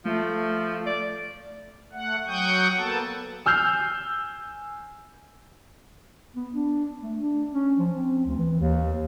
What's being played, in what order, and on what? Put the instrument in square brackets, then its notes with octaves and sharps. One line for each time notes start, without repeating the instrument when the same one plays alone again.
[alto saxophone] F3 [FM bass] A3
[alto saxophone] D5
[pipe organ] A3 F#5
F#3 F#5 G5 C#6 D#6 G6
A#3 B3 A4 A5
[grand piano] G#5 E6 F6 G6 C7
[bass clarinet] B3
D4
A3
D4
C#4
F3
C4
D2
E3
D#2